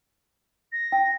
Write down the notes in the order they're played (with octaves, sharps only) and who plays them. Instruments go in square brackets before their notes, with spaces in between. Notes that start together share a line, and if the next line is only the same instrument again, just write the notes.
[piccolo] A#6
[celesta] G5